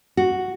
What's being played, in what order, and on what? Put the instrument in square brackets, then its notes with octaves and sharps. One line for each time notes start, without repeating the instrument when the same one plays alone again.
[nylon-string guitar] F#4